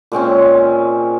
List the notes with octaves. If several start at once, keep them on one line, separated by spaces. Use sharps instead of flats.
A#2 G#3 C4 C#4